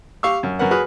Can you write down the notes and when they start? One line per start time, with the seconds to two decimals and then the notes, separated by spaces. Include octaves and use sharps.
0.23 G4 F5 C#6 E6
0.43 F#2
0.59 F#2 A#4 B4 F#5
0.71 F#4 G#4 B4 F6